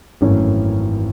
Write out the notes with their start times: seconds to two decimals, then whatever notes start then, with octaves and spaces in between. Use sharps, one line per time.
0.21 G#1 F#2 E3 A3 C#4